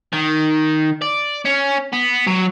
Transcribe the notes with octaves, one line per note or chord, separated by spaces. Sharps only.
D#3
D5
C#4
B3
F#3